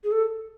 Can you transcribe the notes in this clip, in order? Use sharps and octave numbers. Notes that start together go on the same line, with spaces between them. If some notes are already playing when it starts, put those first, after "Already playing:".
G#4
A4